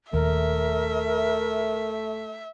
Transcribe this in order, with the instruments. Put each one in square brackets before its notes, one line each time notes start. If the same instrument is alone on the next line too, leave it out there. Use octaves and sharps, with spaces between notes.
[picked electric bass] D#1 D#2 [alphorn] A3 [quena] A#4 [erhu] E5